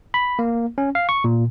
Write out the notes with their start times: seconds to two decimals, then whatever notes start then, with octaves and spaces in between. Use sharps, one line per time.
0.14 B5
0.39 A#3
0.78 C#4
0.95 F5
1.09 C#6
1.24 A#2